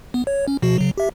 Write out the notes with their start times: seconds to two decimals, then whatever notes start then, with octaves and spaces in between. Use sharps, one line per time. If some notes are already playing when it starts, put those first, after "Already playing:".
0.14 B3
0.27 C#5
0.48 C#4
0.62 B2 F3 F#4
0.78 C#3 F#3
0.98 G4 E5